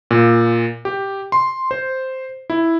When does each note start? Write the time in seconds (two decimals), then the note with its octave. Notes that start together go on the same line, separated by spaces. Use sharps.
0.11 A#2
0.85 G4
1.32 C6
1.71 C5
2.50 E4